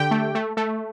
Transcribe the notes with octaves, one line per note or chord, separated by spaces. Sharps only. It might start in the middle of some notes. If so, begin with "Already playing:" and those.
Already playing: D3 G4 G5
A3
A3
A3